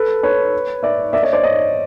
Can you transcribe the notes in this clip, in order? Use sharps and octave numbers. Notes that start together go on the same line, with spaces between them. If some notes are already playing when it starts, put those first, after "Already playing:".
Already playing: A4 B4
B4 C#5
D5 E5
D5 E5
C#5 D#5
C5 D5
C#5 D#5